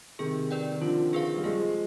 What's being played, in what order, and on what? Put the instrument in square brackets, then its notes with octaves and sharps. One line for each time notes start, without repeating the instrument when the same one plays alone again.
[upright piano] C3 D#3 [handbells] G#4
[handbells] B4 D5 G5
[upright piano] D#3
[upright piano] D3 F3 [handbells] F4
[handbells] G#4 B4 F5
[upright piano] G3
[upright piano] F3 G#3 [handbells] G#4